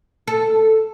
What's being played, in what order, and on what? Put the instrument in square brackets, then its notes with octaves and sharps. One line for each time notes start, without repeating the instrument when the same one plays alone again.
[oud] A4